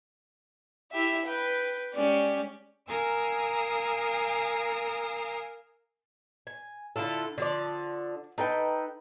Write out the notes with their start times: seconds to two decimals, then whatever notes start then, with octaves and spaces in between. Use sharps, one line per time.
0.91 E4 G4 E5
1.26 B4 G5
1.94 G#3 C#4 G4 D5
2.89 A#4 F5 G#5 A#5 D#6 E6
6.47 G#5
6.96 D3 E4 F4 A4
7.38 D3 F3 D5
8.38 D#4 A4 B4 G5